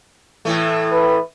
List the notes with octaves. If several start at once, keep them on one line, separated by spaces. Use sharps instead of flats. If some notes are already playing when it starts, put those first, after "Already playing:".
A2 E3 A3
B4